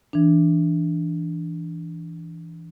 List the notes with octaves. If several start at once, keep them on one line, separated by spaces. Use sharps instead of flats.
E3 D4